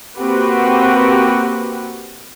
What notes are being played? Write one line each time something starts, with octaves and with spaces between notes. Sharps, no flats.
A#3 C4 F#4 G4 B4 F#5